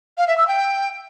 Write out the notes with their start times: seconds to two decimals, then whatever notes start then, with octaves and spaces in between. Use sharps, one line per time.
0.18 F5
0.28 E5
0.38 E6
0.48 G5